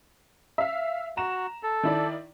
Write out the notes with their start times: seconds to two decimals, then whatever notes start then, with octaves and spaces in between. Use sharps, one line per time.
0.58 E5 F5
1.17 F#4 A#5 E7
1.63 A4
1.83 D#3 E4 D5